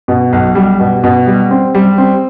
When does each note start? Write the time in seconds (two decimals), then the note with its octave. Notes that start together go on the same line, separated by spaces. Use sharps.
0.08 B2
0.33 B1
0.55 G3
0.80 B2
1.04 B2
1.27 G3
1.51 C4
1.75 G3
1.98 C4